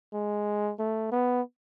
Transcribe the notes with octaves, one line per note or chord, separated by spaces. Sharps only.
G#3
A3
B3